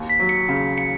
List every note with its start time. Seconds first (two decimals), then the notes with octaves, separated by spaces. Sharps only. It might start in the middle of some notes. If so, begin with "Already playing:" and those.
Already playing: D#2
0.09 B6
0.20 F#3
0.29 C#7
0.49 C#3
0.78 C#7